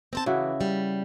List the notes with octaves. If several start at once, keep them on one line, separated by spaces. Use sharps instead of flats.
C4 C5 A5
C#3 E3 E4 F#4
G3